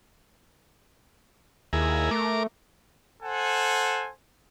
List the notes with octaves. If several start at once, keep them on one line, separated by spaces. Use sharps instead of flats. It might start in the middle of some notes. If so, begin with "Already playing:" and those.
D#2 E4 G#4 A#4
A3 A#4 D6
A4 C5 F#5 G#5